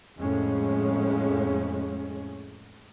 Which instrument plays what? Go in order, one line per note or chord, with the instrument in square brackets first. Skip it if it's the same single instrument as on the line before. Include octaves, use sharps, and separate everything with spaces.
[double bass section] F2 A2 G#3 C#4